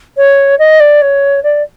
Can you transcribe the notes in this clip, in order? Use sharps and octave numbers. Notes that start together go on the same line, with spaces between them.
C#5
D#5
D5
C#5
D5